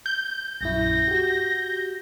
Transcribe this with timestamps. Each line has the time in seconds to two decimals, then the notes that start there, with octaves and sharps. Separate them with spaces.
0.06 G6
0.61 A#1 F#2 E4 A#6
1.08 F#4 G4